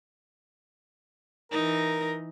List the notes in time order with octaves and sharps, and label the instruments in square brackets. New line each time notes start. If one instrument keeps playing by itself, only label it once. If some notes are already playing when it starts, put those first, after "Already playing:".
[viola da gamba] E3 D#4 [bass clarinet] A#4